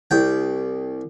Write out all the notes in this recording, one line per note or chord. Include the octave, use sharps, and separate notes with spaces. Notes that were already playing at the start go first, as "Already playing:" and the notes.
C2 G5